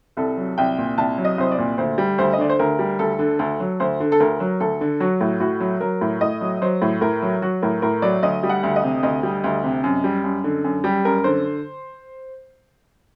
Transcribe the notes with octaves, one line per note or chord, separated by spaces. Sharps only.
C2 A4
F#3
C2 G5
A#2
C2 A5
F#3
D#5
C2 C5
D5
A#2
D2 C5
G3
D2 C5
D#5
D3 D5
C5
D2 A#4
G3
D2 A4
D3
D2 A4
F#3
D2 C5
D3
A4
D2 A#4
F#3
D2 A4
D3
F#3 F#4
A2
A2 F#4
F#3
F#3 A#4
A2
A2 D#5
F#3
F#3 C5
A2
A2 A#4
F#3
F#3 F#4
A2 A#4
A2 A#4
F#3 D5
D2 D#5
G3
F#5
D2
D#5
C3
D2 D#5
G3
D2
C3
F#2
G3
F#2
D3
F#2
G3 G4
F#2 A#4
D3 C5